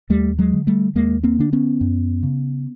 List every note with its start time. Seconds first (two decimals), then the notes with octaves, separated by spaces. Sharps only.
0.10 D#2 G3 A3
0.39 F#3 G#3
0.53 D3
0.67 G3 A3
0.95 D#2 G#3 A#3
1.23 A#3 C4
1.39 D3 D4
1.53 B3 C#4
1.81 F#2
2.23 C#3